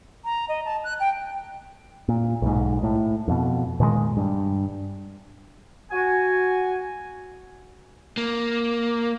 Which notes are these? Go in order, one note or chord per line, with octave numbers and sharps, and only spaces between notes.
A#5
D#5
A5
F#6
G5
A#2
B1 G#2
A2
F2 B2
A#2 D#3 E3 G#3
G2
F#4 G#5
A#3